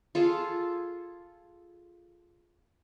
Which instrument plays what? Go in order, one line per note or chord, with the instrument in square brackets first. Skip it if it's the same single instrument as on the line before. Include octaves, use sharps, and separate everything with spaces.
[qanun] F4 G#4 A4